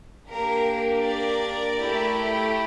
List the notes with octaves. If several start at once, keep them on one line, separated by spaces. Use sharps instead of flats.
A#3 D4 G4 A#4
A#4 D5
A3 E4 G4